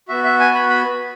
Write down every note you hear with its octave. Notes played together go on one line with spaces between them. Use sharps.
B3 F#4 E5
E5
G#5
B5
B5